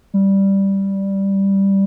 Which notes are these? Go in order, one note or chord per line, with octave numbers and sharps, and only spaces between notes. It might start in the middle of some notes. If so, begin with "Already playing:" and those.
G3